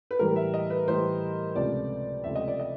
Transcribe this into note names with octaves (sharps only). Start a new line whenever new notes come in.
B4
A2 E3 G3 A#4
E5
D#5
B4
A2 E3 G3 C5
C#2 C3 F3 A3 D5
C#2 C3 F3 A3 E5
D#5
D5
D#5